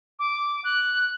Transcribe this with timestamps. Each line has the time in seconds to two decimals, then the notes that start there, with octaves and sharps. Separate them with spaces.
0.19 D6
0.64 F#6